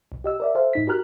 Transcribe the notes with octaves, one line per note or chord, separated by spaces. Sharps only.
B1
G4 D#5 E6
A#4 D5 E5
A4 C5 E5 F5
G#2 D#4 B6
F#4 G4 A#4 A#5 F6 F#6